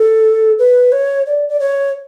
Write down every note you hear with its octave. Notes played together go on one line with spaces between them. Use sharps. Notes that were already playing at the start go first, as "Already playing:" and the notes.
Already playing: A4
B4
C#5
D5
D5
C#5